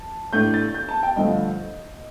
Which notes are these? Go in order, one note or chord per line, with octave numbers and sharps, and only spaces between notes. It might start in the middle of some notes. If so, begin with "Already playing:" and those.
Already playing: A5
A2 A3 D4 G6
A6
G6
A5
G5
G2 D3 F3 A3 D#5